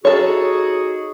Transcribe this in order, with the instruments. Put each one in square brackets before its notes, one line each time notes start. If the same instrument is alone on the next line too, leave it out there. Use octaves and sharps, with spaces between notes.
[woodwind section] D#4 F#4 G#4 [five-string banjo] A4 C#5